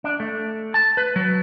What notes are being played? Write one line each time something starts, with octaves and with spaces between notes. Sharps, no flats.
D4
A3
A5
B4
F#3